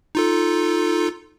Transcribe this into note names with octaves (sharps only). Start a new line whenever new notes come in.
D#4 F4 A4